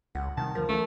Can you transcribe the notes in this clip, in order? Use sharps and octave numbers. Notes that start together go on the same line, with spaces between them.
C#2 F#5
C3 D#3 G3 A5
D2 F3 G3 A#4
E3 A3 C#4